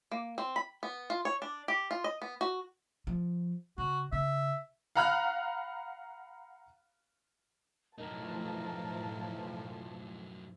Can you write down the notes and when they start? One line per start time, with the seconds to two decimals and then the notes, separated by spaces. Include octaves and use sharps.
0.11 A#3
0.38 C4
0.56 B5
0.83 B3
1.10 F4
1.25 C#5
1.42 D4
1.68 G4
1.91 F4
2.04 D#5
2.22 B3
2.41 F#4
3.07 F3
3.78 C#3 F#4
4.12 C#3 E5
4.95 F5 F#5 A#5 B5 F6 F#6
7.98 F#2 A2 E3 F3 D#4 A#4 A5